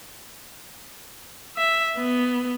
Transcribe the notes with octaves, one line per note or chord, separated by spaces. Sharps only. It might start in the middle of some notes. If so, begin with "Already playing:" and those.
E5
B3